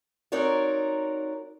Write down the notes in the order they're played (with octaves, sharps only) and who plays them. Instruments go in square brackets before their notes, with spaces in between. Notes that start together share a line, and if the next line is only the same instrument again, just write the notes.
[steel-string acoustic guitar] C4 D#4 F#4 A#4 C#5 D5